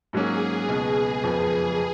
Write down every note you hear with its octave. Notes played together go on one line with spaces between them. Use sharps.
G#2 F#3 A#3 C#4 G#4
C#2 B2 G#3 B3
F#1 F2 F3 B3
B3